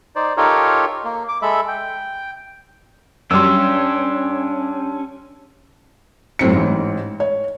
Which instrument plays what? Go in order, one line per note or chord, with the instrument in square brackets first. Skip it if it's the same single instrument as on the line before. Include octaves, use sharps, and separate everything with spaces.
[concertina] D#4 C5 D5
D#4 F4 G4 A4 A#4 C#5
A#3
D6
G#3 A4 E5 B5
G5
[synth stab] F#2 G3 [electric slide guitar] C#4 [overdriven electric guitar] D4 G4 [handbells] C6 E6
[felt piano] F#2 A2 C4 C#7
A1 G#2
C#5